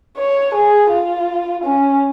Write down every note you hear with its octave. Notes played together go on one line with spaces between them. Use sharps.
C#5
G#4
F4
C#4